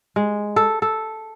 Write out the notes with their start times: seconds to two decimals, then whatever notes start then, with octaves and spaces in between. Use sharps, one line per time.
0.16 G#3
0.56 A4
0.82 A4